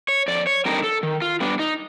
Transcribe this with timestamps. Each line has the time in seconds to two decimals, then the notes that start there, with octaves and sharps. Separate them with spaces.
0.08 C#5
0.28 F2 D5
0.47 C#5
0.65 D3 G3 C4 D#4 A#4
0.84 A4
1.03 D#3
1.22 F4
1.41 G3 B3 D4
1.59 D#4